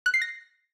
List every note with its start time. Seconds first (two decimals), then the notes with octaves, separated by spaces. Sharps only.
0.06 F#6
0.14 C7
0.22 A#6